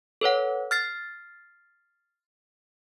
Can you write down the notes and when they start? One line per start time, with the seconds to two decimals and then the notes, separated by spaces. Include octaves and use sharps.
0.21 A4 B4 C#5 F#5
0.71 F6 A6 C7